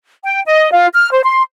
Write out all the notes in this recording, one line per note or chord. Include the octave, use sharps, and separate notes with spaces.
G5
D#5
F4
F6
C5
C6